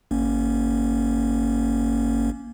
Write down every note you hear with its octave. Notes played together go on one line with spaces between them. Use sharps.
G#1 A#3 C#4